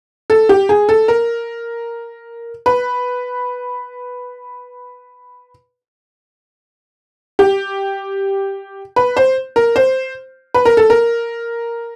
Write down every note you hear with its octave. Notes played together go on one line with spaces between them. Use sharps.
A4
G4
G#4
A4
A#4
B4
G4
B4
C5
A#4
C5
B4
A#4
A4
A#4